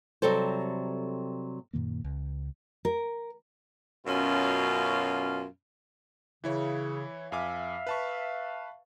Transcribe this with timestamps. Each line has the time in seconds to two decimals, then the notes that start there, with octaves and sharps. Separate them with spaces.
0.22 C3 F#3 G3 A4 C5
1.73 F#2 A#2 D#3 A#3
2.04 C#2
2.85 A#4
4.07 F#2 B2 C#4 F4
6.44 C#3 E3 E4 C#5
7.32 F2 E5 F5 G#5 D6
7.87 B4 A5 C#6